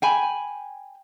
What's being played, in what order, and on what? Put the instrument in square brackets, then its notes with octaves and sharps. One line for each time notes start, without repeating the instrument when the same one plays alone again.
[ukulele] G5 G#5 B5